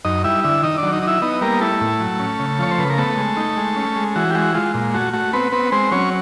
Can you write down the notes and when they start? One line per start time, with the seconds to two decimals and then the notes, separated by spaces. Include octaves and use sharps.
0.05 F#2 D#4 D#5
0.24 G3 E4 E5
0.44 D3 E4 E5
0.63 D#3 D#4 D#5
0.78 F#3 D4 D5
0.93 D#4 D#5
1.03 D#4 E4 E5
1.22 B3 D#4 D#5
1.41 G3 A#3 A#4
1.61 A3 E4 A4
1.81 A2
2.00 F#3
2.20 C#4
2.39 C#3
2.59 F3 C#5
2.71 C5
2.79 C#3 B4
2.90 A#4
2.98 A3 B3 A4
3.18 G#3
3.37 D#4
3.57 G#3
3.76 C#4
3.96 G#3
4.16 E3 F#4
4.31 G4
4.35 G#3 F#4
4.55 G#3 F4
4.74 A#2
4.94 A3 F#4
5.13 A3 F#4
5.33 B3 C4 B4
5.52 B3 C4 B4
5.72 G#3 C4 C5
5.92 F#3 C#4 C#5